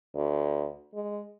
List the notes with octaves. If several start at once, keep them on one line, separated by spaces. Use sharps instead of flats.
D2
G#3